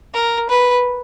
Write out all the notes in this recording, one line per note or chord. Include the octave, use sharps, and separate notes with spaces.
A#4
B4